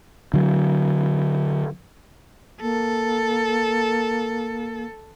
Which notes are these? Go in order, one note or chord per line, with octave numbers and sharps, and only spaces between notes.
D3 F#3
A#3 A4